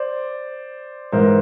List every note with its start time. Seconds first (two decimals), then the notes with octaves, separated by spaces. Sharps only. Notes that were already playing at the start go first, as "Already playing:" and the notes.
Already playing: C5 D5
1.12 G#2 E3 A#4 C5